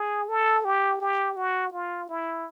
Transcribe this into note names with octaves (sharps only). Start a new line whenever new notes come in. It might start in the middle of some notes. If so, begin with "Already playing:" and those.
Already playing: G#4
A4
G4
G4
F#4
F4
E4